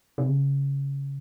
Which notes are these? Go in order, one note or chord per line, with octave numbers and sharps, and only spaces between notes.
C3
C#3